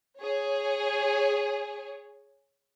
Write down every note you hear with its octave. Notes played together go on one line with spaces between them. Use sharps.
G#4 C#5